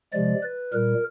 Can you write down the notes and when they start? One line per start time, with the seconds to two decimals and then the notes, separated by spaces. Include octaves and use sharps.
0.13 C3 F3 G#3 D5
0.43 B4
0.73 A#2 G3 A#4